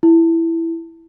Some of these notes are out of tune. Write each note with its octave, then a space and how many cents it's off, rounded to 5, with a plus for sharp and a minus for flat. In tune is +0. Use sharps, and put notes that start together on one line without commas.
E4 +5